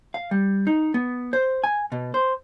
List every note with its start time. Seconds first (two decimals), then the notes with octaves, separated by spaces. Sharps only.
0.14 F5
0.31 G3
0.67 D#4
0.94 B3
1.33 C5
1.64 G#5
1.92 B2
2.14 C5